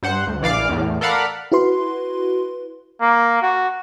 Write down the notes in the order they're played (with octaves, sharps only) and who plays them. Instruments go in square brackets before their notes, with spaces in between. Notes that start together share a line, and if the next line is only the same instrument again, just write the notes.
[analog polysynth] G2 C5 F#5
D2
A#1 E3 D5 F5 D6
E2 A2
A4 A#4 D5 F5 F#5 B5
[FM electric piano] E4 F#4 B4 C6
[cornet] A#3
F#4